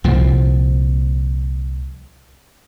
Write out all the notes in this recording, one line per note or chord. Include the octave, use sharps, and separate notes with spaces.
C2 A#2 F3